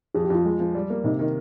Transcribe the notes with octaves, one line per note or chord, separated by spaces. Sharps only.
F2 G#4
G4
F2 F4
G#3
F3
G3
A#3
C3 D#4
D#3 D#4